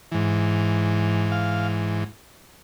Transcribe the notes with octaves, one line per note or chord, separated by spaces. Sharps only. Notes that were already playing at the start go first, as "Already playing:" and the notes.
G#2 E3
F5